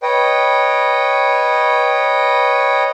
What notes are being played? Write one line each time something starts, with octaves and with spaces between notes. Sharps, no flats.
B4 C#5 D#5 G5